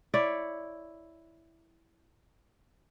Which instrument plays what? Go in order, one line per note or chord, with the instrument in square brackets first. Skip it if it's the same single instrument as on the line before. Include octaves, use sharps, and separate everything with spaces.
[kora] E4 C#5 D5